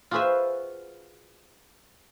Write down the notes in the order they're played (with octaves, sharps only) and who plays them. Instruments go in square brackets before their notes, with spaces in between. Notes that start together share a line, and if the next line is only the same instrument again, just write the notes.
[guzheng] F4 F#4 G#4 B4 C5 E5